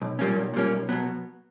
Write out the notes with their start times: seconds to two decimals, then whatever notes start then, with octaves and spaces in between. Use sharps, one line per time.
0.02 B1
0.19 A#2 G3 A#3 C#4
0.36 B1
0.54 A#2 G3 A#3 C#4
0.72 B1
0.89 B2 F#3 B3